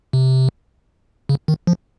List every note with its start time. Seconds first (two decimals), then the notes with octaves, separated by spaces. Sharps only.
0.13 C3
1.29 C#3
1.48 D#3
1.67 F3